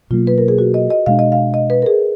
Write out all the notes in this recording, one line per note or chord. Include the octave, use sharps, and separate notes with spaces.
B2 F#3 A#3 F4
B4
A#4
G#4
F#4
D#5
D#5
B2 G#3 D4 F5
D#5
F5
D#5
B4
A#4
G#4